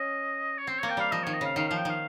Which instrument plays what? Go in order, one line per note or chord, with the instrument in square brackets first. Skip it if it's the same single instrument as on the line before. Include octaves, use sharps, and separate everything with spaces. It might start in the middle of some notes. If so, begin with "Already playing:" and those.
Already playing: [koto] C#4 [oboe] D#5
[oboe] C#5
[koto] C4 [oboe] C5
[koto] A#3 [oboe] C#5
[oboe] G5
[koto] G3 [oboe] F5
[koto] F3 [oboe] D#5
[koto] D#3 [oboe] C#5
[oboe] D#5
[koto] C#3 [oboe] F5
[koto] D#3 [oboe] F5
[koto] F3 [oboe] F5
[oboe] G5
[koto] D#3 [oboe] F5